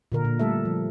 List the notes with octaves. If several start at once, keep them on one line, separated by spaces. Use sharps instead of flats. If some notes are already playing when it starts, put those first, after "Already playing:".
A#2 D3 A#4
A#2
G3 A3 A4 E5
F3